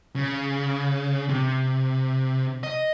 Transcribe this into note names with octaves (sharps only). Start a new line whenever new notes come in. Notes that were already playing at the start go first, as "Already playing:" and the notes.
C#3
C3
D#5